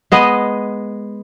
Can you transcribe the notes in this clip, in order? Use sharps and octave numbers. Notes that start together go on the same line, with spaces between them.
G#3 B3 D#5